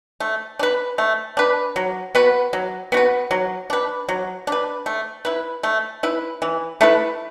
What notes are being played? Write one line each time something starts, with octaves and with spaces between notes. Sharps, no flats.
A3
D4
B4
A3
D4 B4
F#3
B3 F#4 B4
F#3
B3 F#4 B4
F#3
D4 B4
F#3
D4 B4
A3
E4 B4
A3
E4 B4
E3
A3 E4 B4